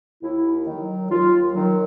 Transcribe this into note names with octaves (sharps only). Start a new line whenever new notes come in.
D#2 E4
D#3 F#3
D#2 F4
D#3 F#3